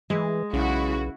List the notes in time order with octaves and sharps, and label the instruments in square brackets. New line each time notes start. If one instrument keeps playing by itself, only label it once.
[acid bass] E3 [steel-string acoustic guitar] G#3
[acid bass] B1 [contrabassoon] C#3 [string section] E4 F#4